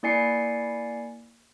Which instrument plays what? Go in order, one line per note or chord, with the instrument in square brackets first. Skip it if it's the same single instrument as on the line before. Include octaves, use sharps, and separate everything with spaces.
[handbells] A#3 E4 D5 G#5 C7 C#7